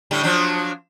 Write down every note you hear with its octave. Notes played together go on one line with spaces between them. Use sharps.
A2 D3 G3
F3 F#3 D4